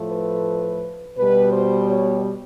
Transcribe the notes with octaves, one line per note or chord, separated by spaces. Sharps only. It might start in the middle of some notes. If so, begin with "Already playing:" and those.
Already playing: A2 F3 A3
B4
B2 G3 B4
C5
C#5